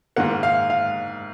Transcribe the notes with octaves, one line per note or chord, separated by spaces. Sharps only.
G#2 D#3 A#3 F#5
F5
F5